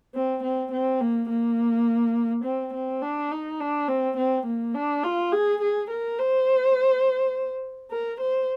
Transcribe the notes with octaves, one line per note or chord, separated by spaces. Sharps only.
C4
C4
C4
A#3
A#3
C4
C4
D4
D#4
D4
C4
C4
A#3
D4
F4
G#4
G#4
A#4
C5
A#4
C5